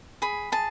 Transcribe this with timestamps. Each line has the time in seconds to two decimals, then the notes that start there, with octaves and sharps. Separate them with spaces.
0.22 G#4 B5
0.52 G#4 A5